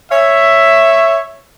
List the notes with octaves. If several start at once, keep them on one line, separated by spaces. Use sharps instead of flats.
C#5 E5